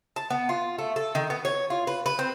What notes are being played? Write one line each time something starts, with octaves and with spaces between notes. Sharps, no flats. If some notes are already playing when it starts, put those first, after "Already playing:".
A5
B3
F4
A3
A4
D#3
B3
C#5
F4
B4
B4
C4